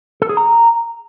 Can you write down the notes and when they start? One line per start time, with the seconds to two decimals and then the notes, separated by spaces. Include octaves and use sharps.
0.22 A4
0.29 G#4
0.37 A#5